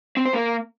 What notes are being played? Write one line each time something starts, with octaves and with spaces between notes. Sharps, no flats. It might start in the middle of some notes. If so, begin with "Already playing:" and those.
C4
C5
A#3